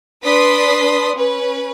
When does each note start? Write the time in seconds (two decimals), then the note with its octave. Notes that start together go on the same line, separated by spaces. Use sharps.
0.24 D4 B4 C6 D#6 B6
1.15 C#4 B4